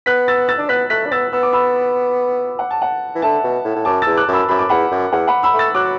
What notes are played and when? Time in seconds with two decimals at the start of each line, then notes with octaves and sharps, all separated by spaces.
0.06 B3 F#6 B6
0.28 E6 A6
0.48 E6 A6
0.58 D4
0.69 B3 F#6 B6
0.90 A3 F#6 B6
1.06 D4
1.12 B3 E6 A6
1.32 B3 E6
1.43 D6
1.53 B5 E6
2.59 F#5
2.71 A5
2.82 F#5
3.15 E3
3.22 D3 E5 A5
3.43 B2
3.64 A2
3.75 A2
3.85 F#2 A5 D6
4.02 E2 E6 A6
4.17 D6 F#6
4.28 F#2
4.33 B5 E6
4.49 F#2 B5
4.59 D6
4.69 E2 F#5 B5
4.91 F#2
5.12 E2 F#5
5.28 F#5 B5
5.43 B5 E6
5.54 A3
5.59 E6 A6
5.75 F#3 D6 F#6